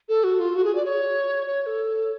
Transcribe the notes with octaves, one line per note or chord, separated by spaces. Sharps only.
A4
F#4
F4
F#4
G#4
D5
C#5
C#5
C#5
A4